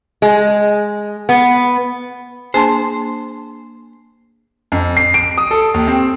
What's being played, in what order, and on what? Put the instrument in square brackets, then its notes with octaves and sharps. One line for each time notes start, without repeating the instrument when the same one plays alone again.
[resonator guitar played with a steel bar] G#3
B3
[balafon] A#3 D4 G#4 [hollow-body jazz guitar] C5 [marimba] G#5 A5 C6
[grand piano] F2
C7
D7
D#6
A4
D#2
C4